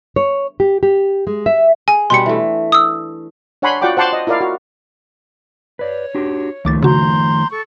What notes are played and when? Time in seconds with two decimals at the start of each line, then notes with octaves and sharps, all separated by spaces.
0.16 C#5
0.60 G4
0.83 G4
1.27 G#3
1.46 E5
1.88 G#4 G#5
2.10 B2 G3 D4 C6 C#7
2.26 E3 A3
2.72 D#6 E6
3.62 D4 C#5 F#5 G#5 B5 C6
3.82 F4 F#4 D5 F#5 G5 D6
3.97 C5 F#5 A5 C6 D6
4.13 D#5
4.27 E4 F4 A#4 D5 F5
4.41 F#4
5.79 B4 C#5 D5
6.15 D4 F#4 G4
6.65 C#2 D#3 F3 A3 D6 A6
6.83 C#3 F#4 A#5 C6 G6
7.50 A4 C#6